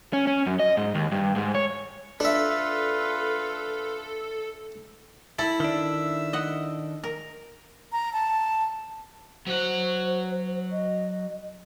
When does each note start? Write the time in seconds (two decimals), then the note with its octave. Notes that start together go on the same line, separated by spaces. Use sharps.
0.13 C#4
0.27 C#4
0.46 F#2
0.59 D#5
0.77 G#2
0.95 D#2
1.12 G2
1.36 G#2
1.55 C#5
2.20 D4 F4 A4 B4 E5
5.39 E4 A4 B5
5.60 D#3 D4 E5
6.33 D#5 F#5
7.04 A#4
7.92 A#5
8.13 A5
9.47 F#3 C5 F#5
10.72 D#5